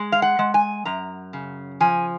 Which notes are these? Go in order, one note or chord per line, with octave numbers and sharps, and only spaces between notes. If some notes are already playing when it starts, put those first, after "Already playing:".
Already playing: G#3
F5
F#5
G#3
G#5
F#2 A#5
C#3
F3 G#5